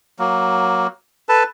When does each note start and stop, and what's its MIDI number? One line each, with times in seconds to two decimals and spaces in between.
0.19 0.87 54
0.19 0.87 58
1.29 1.43 69
1.29 1.43 71
1.29 1.43 81